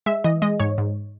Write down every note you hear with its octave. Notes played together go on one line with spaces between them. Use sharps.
G#3 E5
E3 D#5
G#3 D#5
G#2 C#5
G#2